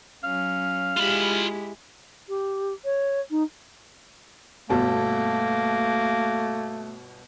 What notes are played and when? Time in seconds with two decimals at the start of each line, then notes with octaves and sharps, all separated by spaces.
0.24 F#3 C#4 F5
0.97 G#3 E4 F4 G4 B5
2.28 G4
2.85 C#5
3.30 D#4
4.70 G1 B2 A3 A#3 A5